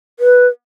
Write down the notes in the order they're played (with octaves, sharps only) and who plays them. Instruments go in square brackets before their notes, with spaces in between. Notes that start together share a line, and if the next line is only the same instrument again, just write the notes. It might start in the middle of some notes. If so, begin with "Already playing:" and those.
[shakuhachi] B4